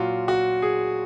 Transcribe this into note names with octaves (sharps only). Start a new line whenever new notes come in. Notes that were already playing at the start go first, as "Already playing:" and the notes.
Already playing: A#2 F#3 F4 F#4
F#4
G#4